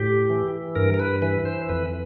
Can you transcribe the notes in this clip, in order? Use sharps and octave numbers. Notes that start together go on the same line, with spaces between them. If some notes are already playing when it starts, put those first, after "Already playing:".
Already playing: A2 G4
E3
G2 A#4
A#4
B4
E3 B4
C5
F2 B4